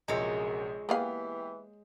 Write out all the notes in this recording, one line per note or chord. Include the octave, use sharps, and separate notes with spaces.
A#1 F#2 C3 G#3 C#5
E3 A#3 B3 G4 G#4 F5